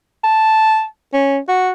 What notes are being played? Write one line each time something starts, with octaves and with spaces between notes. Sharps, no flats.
A5
C#4
F#4